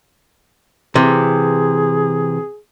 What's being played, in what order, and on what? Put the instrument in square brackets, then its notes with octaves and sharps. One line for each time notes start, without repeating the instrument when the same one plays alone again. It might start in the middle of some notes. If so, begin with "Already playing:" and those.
[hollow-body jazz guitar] C3 E3 [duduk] G#4